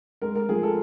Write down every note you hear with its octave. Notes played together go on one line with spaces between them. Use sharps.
G#3 A#4
A#4
F3 G#4
A4